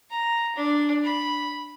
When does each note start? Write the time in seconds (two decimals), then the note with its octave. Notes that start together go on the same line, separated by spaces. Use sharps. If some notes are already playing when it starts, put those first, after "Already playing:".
0.10 A#5
0.56 D4
1.04 B5